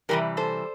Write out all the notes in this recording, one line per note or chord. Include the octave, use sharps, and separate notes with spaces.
C3 E3 G3 G4 A#4
A4 C5